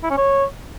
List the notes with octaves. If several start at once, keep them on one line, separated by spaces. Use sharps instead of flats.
E4
C#4
C#5